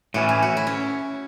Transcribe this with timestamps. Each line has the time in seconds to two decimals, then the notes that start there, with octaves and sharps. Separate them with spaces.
0.14 A2 E3 C#4 F#4
0.29 E4
0.42 F#4
0.57 E4
0.67 C#4